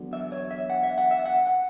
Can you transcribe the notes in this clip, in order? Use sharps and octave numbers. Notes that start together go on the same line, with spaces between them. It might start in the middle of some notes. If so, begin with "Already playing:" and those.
Already playing: E2 D3 F#3
E5
C#5
E5
F#5
E5
F#5
E5
F#5
F#5